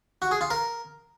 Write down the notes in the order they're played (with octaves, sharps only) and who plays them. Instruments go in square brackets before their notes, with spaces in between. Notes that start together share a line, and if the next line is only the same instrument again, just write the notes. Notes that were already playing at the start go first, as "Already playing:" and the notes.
[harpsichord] F#4
G#4
F4
A#4